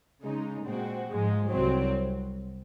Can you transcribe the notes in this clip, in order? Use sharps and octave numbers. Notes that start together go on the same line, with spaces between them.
C#3 G#3 D#4
A#2 G#3 C4 F#4
G#2 F3 G#3
C2 C3 F#3 C4